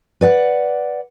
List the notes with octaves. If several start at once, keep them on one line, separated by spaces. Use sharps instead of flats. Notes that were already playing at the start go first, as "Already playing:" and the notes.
B4 D5 F#5